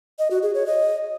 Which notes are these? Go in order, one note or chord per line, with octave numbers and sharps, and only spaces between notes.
D#5
F#4
G#4
C#5
D#5